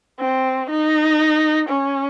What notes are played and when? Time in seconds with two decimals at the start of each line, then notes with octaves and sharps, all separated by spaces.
0.20 C4
0.70 D#4
1.69 C#4